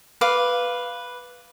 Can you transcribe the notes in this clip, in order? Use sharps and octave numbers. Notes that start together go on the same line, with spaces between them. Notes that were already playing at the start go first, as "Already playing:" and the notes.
B4 F5 D6